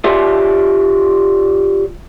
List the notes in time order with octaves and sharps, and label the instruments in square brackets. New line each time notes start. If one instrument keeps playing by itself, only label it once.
[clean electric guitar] F4 G4 C#5 D5 E5